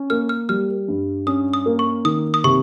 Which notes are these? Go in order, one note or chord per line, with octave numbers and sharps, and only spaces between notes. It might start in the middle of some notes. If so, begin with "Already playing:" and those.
Already playing: C#4
A#3 F6
F6
G3 F6
G2
C#4 D#6
D#6
A#3
C#6
D#3 D#6
D#6
C3 C#6